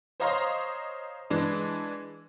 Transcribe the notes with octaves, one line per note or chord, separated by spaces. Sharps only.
C5 C#5 D#5 F5 A#5 C6
E3 G#3 D4